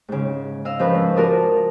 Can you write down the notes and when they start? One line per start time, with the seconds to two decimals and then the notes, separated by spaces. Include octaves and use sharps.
0.08 G#2 C#3
0.65 D#5 F5 E6
0.79 F3 C#4 A#4 B4
0.95 G#2
1.16 F4 F#4 A#4 D5 A5 D#6